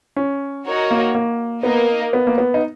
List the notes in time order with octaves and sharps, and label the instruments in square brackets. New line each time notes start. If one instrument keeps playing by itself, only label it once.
[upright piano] C#4
[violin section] D#4 F#4 A#4 C#5
[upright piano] A#3
A#3
[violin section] A#3 D#4 A#4 D#5 [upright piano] B3
[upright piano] B3
A#3
B3
D#4